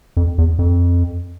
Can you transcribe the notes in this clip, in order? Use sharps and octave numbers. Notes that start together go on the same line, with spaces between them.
F2
E2
F2